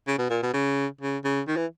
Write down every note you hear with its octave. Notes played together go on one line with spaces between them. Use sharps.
C#3
B2
A#2
B2
C#3
C#3
C#3
D#3
E3